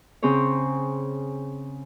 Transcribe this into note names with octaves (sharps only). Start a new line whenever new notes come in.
C#3 C4 G#4 C5 C#5